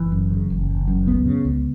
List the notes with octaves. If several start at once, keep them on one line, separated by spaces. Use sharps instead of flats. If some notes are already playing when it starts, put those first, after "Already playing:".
Already playing: F#1 E3
F#2
C#3
F#1
F#1
F#2
C#2 B3
C#3
C#2